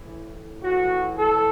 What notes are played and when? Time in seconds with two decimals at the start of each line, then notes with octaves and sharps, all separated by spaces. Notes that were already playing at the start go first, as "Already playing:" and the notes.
Already playing: A2 E3
0.62 A2 E3 F#4
1.18 A4